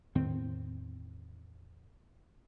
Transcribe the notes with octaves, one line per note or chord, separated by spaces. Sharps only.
E2 A2 D#3 C4